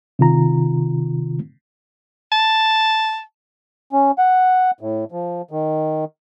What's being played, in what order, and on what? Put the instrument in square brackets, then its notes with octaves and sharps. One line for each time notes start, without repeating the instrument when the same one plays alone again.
[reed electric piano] C3 D#3 F4 A#5
[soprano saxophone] A5
[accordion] C#4
F#5
A2
F3
D#3